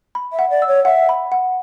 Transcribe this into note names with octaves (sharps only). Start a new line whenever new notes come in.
B5
E5
F#5
D5
E6
C#5
E5 F#5
B5
F#5